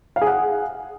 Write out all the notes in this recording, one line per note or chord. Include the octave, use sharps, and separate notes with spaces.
F5
G#4
F#5